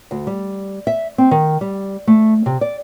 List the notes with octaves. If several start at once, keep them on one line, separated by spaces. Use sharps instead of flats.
D2
G3
E5
C4
D#3
G3
A3
C3
D5